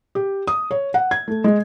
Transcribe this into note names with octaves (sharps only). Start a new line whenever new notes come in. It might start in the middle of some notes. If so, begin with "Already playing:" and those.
G4
D#6
C#5
F#5
G#6
A3
G#3